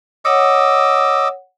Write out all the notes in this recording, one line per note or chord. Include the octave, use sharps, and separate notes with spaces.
C#5 D#5 F#5 D6 E6